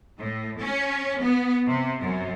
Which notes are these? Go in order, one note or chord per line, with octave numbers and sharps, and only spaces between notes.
A2
C#4
B3
C3
F#2